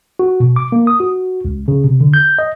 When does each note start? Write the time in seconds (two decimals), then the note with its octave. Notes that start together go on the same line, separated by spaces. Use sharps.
0.19 F#4
0.40 B2
0.56 D6
0.72 A#3
0.87 D#6
1.00 F#4
1.45 C#2
1.68 C#3
1.84 C3
2.01 D3
2.14 G6
2.39 D#5